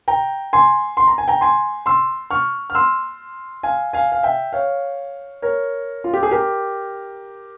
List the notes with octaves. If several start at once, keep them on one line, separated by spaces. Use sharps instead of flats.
G5 A#5
G#5 C6
C6
A#5
G#5
G5 A#5
G#5 C6
C6 E6
C#6 F6
F6
C6 E6
F5 G#5
F5 G#5
F5
E5 G5
C#5 F5
A#4 C#5
F4
G4
G#4
G4 A#4